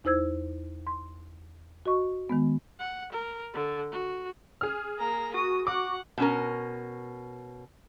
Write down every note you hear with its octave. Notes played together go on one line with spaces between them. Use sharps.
E2 D#4 E4 C5 E6 G#6
C6
F#4 D#5 C#6
D#3 G#3 B3
F#5
A#4
D3
F#4
G#4 F6
A#3 A#5
F#4 D#6
F#5 D6
B2 C#4 A#4